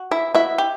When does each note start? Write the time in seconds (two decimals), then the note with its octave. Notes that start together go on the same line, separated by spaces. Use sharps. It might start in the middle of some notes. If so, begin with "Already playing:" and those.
Already playing: F#4
0.11 E4 E5
0.34 E4 F#4 E5
0.58 G4